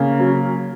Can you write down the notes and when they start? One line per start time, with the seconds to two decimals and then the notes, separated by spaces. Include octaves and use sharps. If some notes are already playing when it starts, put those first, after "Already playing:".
Already playing: C#3 A#3 C#4
0.20 F#3